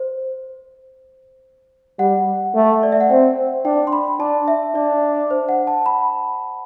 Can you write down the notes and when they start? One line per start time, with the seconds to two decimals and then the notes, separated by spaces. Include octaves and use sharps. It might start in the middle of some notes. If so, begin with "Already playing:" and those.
Already playing: C5
1.99 G3 F#5
2.55 A3
2.83 D5
2.92 E5
3.01 F#5
3.10 C4 G5
3.65 D4 G5
3.87 C6
3.93 B5
4.20 D4 A5
4.48 E5
4.75 D4 D5
5.31 C5
5.49 F#5
5.67 A5
5.86 B5